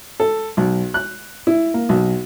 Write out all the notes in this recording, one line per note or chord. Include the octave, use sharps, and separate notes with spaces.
A4
B1
F#6
E4
A#3
B1